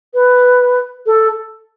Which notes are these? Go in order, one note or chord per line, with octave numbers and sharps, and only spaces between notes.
B4
A4